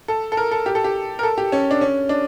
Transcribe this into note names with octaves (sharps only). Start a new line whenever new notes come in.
A4
A4
A#4
A4
G4
A4
G4
A#4
A4
G4
C#4
D4
C#4
D4